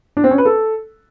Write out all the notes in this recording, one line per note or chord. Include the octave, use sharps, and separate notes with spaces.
D4
C4
C#4
B4
A4